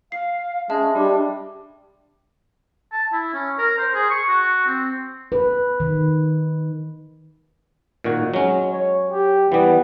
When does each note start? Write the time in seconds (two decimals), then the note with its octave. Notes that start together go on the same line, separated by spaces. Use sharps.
0.12 F5 C7
0.70 G#3 C#4 E5 A5
0.95 G3 D4
2.92 A5
3.13 E4
3.34 C#4
3.58 A#4
3.78 C5
3.94 G#4
4.10 C#6
4.29 F#4
4.66 C4
5.32 B4
5.80 D#3
8.04 A#2 D#3 F#4
8.34 F#3 G#3 C#4
8.72 C#5
9.11 G4
9.52 E3 G3 B3